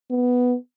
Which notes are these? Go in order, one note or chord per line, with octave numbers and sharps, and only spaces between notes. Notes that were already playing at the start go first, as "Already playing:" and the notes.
B3